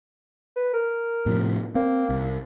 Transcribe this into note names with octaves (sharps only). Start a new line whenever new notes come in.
B4
A#4
A2 C3 F3
A#3 C4
C2